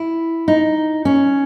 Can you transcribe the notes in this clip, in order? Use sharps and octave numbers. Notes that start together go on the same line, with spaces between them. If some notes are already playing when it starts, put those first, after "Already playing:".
Already playing: E4
D#4
C#4